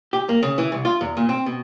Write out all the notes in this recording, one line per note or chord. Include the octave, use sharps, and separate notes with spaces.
G4
A#3
C#3
E3
C2
F4
E2
A#2
C4
B2